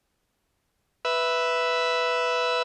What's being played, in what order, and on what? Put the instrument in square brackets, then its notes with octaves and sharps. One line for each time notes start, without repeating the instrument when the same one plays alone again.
[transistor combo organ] B4 E5